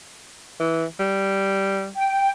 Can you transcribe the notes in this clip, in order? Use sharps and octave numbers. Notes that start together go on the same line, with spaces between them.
E3
G3
G5